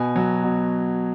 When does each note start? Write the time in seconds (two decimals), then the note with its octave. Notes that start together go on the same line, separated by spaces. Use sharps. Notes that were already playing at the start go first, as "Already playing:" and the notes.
Already playing: B2 G#5
0.16 F#3
0.43 B2